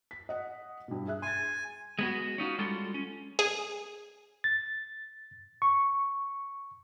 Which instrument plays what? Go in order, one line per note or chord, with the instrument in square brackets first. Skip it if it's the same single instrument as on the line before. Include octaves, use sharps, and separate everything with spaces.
[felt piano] B6
D#5 F#5
G2 B2
G#4 E5 F#6
[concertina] G#5 [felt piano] C6 A6
[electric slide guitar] G#3 B3 F#4
C#4 D#4 F4 F#4
G3 G#3 F4 F#4 A4
C#4
[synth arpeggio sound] G#4
[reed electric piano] A6
C#6